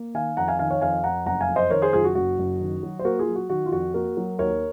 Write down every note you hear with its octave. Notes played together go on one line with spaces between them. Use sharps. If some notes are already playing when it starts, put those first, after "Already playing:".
Already playing: A#3
D#3 F5 G#5
F2 F#5 A#5
F5 G#5
D#3 F5 G#5
C#5 F5
F2 F5 G#5
F2 F#5 A#5
F#1 F#5 A#5
F5 G#5
F2
C5 D#5
D#3 A#4 C#5
G#4 C5
F#1 F4 G#4
F#4
F#1 F#4
F#1
D#3
F#3
C5
A#3 F#4 A#4
F4 G#4
F#3
F#4
D#3 F#4
F4
F2 F#4
A#3 F#4 A#4
F#3
D#2 A#4 C#5